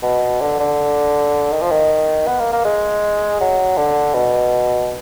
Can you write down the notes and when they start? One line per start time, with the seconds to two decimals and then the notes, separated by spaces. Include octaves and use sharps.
0.03 B2
0.41 D3
0.59 D3
1.53 D#3
1.61 F3
1.70 D#3
2.27 B3
2.40 A#3
2.53 A#3
2.65 G#3
3.40 F#3
3.77 D3
4.14 B2